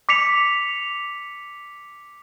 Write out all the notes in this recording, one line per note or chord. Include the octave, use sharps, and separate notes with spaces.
D6 B6 C#7 F7